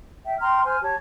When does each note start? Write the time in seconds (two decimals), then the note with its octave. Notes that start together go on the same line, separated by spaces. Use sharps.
0.25 E5 G5
0.40 G5 A#5 C6 F6
0.65 C5 G#5 F6
0.82 G4 C#5 A5